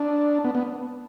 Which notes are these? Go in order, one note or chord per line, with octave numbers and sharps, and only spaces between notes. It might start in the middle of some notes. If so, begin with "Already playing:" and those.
Already playing: D4
B3
B3